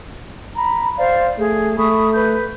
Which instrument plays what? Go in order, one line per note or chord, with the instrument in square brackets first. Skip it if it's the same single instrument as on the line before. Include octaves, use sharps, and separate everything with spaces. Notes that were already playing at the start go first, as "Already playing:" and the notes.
[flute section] A#5 B5
C5 D5 F5
[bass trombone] A3 [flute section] G#4
[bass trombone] A3 [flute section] B5 C#6 D#6
[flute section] B4 G6